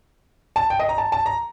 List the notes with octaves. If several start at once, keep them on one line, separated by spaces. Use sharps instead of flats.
A5
G5
D#5
A#5
A5
A5
A#5